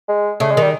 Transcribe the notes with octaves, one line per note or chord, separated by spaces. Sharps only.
G#3
C#3 A3
G#3
D#3 G3